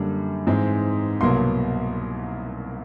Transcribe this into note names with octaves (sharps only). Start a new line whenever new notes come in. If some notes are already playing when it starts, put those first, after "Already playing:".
Already playing: F#2 D3 G3 A#3
G#2 E3 G#3 C4
C2 B2 F#3 A#3 C6